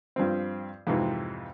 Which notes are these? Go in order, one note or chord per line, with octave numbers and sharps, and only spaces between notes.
G2 F3 C4
F2 G#2 C3 E3